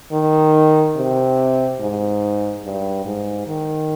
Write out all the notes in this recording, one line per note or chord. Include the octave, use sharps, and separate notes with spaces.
D#3
C3
G#2
G2
G#2
D#3